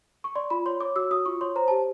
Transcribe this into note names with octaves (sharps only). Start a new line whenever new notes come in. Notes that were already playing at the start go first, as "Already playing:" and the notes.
C#6
D5 C6
F4 B5
C#5 C6
C#5 D6
F#4 E6
F#4 D#6
F4 C#6
C#5 C6
C5 A#5
G4 A5